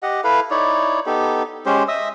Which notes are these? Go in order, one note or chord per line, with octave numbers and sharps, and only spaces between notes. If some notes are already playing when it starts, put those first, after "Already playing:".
G4 D#5 F#5
E4 A4 B4 F5
D#4 E4 C#5 D5
B3 D#4 G4 A4
G#3 C#4 G4 C5
D#5 E5 D#6 E6